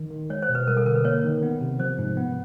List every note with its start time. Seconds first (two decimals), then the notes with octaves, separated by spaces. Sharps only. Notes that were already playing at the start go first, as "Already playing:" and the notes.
Already playing: D#3
0.11 D#3
0.30 G#3 C#5
0.42 C5
0.49 B2
0.55 B4
0.67 G3 A#4
0.77 A4
0.86 D3 A#4
0.95 B4
1.04 A#3 C#5
1.24 D#3
1.43 B3
1.61 C3
1.79 F3 C5
1.98 G#2
2.17 B3